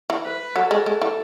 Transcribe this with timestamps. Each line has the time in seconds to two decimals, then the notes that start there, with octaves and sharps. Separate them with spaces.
0.10 E3
0.25 B4
0.56 F#3 A4
0.71 G#3
0.86 G#3
1.02 E3